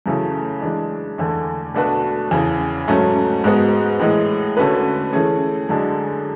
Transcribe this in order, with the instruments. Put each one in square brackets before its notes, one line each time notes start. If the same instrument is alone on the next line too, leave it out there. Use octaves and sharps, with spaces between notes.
[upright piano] F#2 C#3 E3 A3
E3 G#3 D4
E2 D3 A3
B2 A3 D4 F#4 B4
E2 C#3 E3
G#2 F#3 A3 C#4
G#2 G#3 B3 F#4
A2 E3 G#3
D3 A3 C#4 F#4 B4
E3 A3 C#4 G#4
F#2 D3 G#3 D4